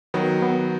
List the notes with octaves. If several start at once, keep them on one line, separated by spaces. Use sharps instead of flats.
D#3 F#3 B3
B3